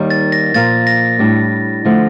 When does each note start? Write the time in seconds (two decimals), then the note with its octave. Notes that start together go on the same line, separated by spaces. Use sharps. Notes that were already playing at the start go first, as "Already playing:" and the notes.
Already playing: D#2 D#3 G3 A#3 D#4
0.10 A6
0.32 A#6
0.54 A#2 F3 A#3 F4 A#4 A6
0.87 A#6
1.19 A2 G3 D4
1.85 D3 F3 A3